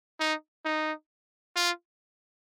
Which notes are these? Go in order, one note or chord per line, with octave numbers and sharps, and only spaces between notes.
D#4
D#4
F4